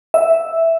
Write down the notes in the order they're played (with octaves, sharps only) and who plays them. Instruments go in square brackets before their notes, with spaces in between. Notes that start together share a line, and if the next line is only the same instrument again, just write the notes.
[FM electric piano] E5